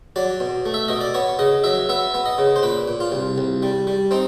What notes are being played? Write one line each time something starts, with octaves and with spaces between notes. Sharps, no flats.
F#3 D5
B2
A3
E5
B2 D#5
D5
B3 C#5
C#3 D#5
F#3 E5
B3 E5
B3
D#5
C#3
C5
A#2 B4
A#2
F4
C2
C2
G3
G3
C4 D#4